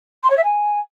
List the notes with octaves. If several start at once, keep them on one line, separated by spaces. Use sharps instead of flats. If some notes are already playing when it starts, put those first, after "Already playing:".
C6
C#5
E5
G#5